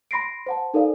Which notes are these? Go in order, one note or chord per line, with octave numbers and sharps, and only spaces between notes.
B5 C6 A#6 C7 D7
C5 F#5 A5
D#4 A4 A#4 C5 D5 F5